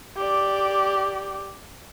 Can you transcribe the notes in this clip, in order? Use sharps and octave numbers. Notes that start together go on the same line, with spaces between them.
G4 D5